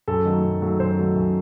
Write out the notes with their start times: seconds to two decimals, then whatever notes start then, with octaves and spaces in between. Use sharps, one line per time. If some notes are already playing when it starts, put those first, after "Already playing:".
0.08 F#2 A4
0.25 D#3 F#3 A3
0.44 F#2
0.62 D#3 F#3 A3
0.80 F#2 C5
0.98 D#3 F#3 A3
1.16 F#2